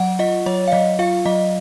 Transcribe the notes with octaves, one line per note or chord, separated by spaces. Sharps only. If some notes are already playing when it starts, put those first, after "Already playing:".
Already playing: F#3 F#5
F4 D#5
F#3 C#5
F5
F#3 D#5
F4 F5
F#3 D#5